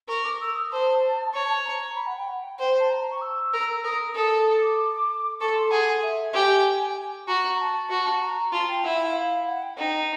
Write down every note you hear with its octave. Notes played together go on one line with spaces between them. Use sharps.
A#4 C#6
D6
E6
D#6
C5 A5
C#5
A#5
B5
F#5
G5
F#5
G5
C5 G5
A5
A#5
A#5
C#6
E6
A#4
A#4 D#6
A4 D#6
D#6
D#6
D6
A4 C#6
C6
G#4 F#5
E5
G4 G#5
F#4 A#5
A5
F#4
A#5
F4 A5
G5
E4 F#5
F5
F5
F#5
G5
D#4 G5